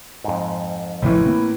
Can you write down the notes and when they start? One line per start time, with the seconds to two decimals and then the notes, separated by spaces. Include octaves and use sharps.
0.24 F2 G#2
1.02 A1 A2 C#3 E3 F3
1.26 A#3 C4